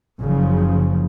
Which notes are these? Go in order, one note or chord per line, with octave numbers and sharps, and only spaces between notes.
F#1 C#3 F3